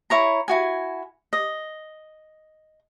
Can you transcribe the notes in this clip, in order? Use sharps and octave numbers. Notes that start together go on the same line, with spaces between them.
E4 C#5 A#5
E4 F#4 G#5
D#5